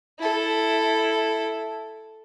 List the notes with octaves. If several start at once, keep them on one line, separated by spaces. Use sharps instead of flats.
E4 A4